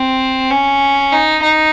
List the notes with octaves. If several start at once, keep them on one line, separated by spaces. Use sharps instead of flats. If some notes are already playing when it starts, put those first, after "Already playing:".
Already playing: C4
C#4
D#4
D#4